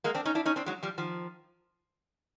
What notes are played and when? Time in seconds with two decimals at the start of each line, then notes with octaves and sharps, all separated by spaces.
0.04 G#3 A#3
0.15 C4 D4
0.25 C#4 D#4
0.35 D4 E4
0.45 C#4 D#4
0.56 C4 D4
0.66 F#3 G#3
0.83 F3 G3
0.98 D#3 F3